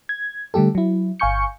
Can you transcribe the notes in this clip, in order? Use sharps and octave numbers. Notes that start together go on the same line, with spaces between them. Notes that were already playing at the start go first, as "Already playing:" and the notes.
G#6
D3 G3 A3 G4 A4
F#3 E4
G1 F5 G#5 C#6 G6 C#7